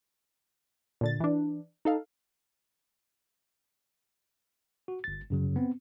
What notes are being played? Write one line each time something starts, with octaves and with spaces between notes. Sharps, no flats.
A#2 D3 A6
E3 D4
D#4 A4 F5
F#4
G1 A6
F#2 C#3 F#3
B3 C4